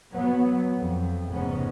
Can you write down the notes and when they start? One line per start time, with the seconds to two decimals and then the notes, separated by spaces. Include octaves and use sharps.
0.13 F#3 B3
0.78 F2
1.29 F1 G#2 C#3 B3 C#4